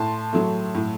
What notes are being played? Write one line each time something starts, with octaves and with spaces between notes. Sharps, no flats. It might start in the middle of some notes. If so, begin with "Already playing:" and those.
Already playing: A2 A5 C6
F#3 A3
A2